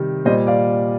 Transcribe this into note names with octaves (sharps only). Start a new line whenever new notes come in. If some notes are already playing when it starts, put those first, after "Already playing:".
Already playing: C3 D#3 G3
A#2 G3 C5 D#5
D5 F5